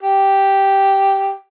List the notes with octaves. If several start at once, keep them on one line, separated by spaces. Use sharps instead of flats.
G4